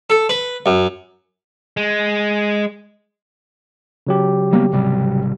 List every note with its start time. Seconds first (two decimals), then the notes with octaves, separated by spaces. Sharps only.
0.10 A4
0.29 B4
0.66 F#2
1.77 G#3
4.07 C#3 F#3 G4
4.53 G3 A#3 B3
4.72 G#1 C3 G3